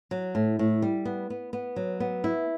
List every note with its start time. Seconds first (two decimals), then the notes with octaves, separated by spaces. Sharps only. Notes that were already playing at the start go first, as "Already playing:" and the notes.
0.11 F#3
0.35 A2
0.59 A2
0.82 G3
1.05 B3
1.30 B3
1.53 B3
1.76 F#3
2.00 B3
2.24 E4